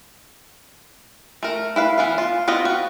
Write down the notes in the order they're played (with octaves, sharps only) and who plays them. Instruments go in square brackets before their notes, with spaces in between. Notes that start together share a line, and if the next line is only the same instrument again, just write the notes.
[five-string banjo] A3 A#4
E4 B4 F5
E3 B3 F5
F4
B3 C4 F4 D#5
F#4